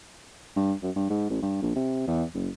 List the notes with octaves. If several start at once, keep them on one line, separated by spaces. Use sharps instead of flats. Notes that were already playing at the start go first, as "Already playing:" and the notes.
G2
F#2
G2
G#2
A1
G2
A#1
C3
E2
F#1